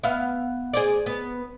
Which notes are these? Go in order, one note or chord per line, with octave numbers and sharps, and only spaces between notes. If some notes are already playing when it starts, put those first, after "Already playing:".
B3 E5 F5
G#4 C5 D5
B3